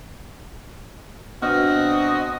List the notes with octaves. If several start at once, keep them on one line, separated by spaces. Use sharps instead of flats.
B2 B3 C4 D4 F#4 D#5 F6